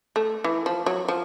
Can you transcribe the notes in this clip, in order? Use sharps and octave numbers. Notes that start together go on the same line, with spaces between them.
A3
E3
F3
F#3
F3